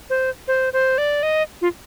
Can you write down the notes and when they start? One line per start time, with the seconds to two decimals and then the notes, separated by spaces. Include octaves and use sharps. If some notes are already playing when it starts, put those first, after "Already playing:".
0.10 C5
0.48 C5
0.73 C5
0.98 D5
1.23 D#5
1.62 F4